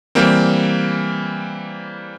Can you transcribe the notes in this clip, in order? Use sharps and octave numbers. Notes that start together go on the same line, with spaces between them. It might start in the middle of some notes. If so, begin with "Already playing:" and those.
E3 G3 A#3 C4